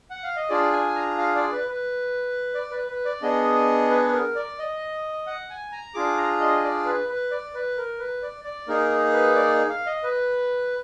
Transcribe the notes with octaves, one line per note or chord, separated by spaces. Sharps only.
F#5
F5
D#5
D4 F4 G#4 D5
G#5
A#5
F5
D5
B4
B4
D5
B4
B4
D5
B3 D4 G#4 D#5
B4
B4
A#4
D5
D#5
F#5
G#5
A#5
D4 F4 G#4 D6
A#5
D#5
D5
B4
B4
D5
B4
A#4
B4
D5
D5
A#3 D#4 G#4 A#4
B4
D5
F5
D#5
B4